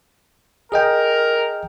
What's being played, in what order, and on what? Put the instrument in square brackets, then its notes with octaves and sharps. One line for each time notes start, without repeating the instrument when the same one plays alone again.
[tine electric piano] G#4 D#5 G5 [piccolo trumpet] A#4